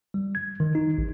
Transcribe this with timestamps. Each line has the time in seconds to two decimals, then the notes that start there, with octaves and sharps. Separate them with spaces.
0.14 G3
0.35 G#6
0.60 D#3
0.75 D#4
0.98 A1